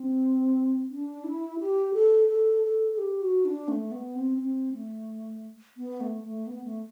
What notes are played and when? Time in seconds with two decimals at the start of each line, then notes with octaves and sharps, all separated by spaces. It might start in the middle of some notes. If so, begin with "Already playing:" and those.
Already playing: C4
0.90 D4
1.24 E4
1.60 G4
1.94 A4
2.28 A4
2.63 A4
2.92 A4
2.98 G4
3.22 F#4
3.45 D4
3.68 A3
3.91 B3
4.15 C4
4.38 C4
4.73 A3
5.77 B3
6.01 A3
6.24 A3
6.47 B3
6.64 A3